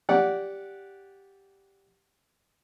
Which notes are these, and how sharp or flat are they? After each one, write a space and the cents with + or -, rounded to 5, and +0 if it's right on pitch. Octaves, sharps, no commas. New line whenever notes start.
G4 +0 D5 -15 F#5 -5